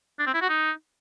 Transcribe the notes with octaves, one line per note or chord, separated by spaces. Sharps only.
D4
C4
E4
F#4
D#4